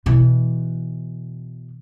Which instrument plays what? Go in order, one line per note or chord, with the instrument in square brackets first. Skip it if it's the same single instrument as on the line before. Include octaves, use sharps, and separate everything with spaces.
[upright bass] B2 E3